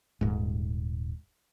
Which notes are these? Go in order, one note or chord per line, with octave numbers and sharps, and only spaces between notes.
D#1 G#2